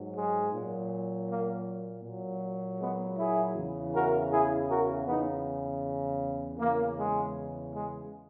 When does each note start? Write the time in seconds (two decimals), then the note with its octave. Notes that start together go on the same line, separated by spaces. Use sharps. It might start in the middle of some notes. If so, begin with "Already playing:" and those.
Already playing: G#2 F#3
0.14 G#3
0.52 A#2 F#3
1.28 A#3
2.04 A#2 F#3
2.80 G#3 B3
3.18 E4 G#4
3.56 E2 C#3 E3
3.94 F#4 A#4
4.31 E4 G#4
4.69 F#4 A#4
5.07 E2 C#3 E3 B3 D#4
6.59 E2 C#3 E3 A#3
6.97 G#3
7.73 G#3